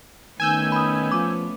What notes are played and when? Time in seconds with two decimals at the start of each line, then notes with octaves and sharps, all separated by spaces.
0.40 D#3 A3 B3 C#4 G#5 E6 G6
0.72 B5 D#6
1.12 F3 D6